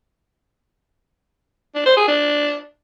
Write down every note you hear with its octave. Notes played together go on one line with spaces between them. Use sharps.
D4
C5
G#4
D4